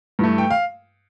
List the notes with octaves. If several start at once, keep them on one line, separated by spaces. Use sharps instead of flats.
G2 E3 A3
G5
F5